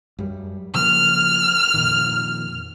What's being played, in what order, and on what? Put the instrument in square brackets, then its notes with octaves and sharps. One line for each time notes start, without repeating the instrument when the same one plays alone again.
[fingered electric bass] F#2 G3
[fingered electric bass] C#3 F3 A#3 [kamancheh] F6
[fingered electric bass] F2 A#2 D#3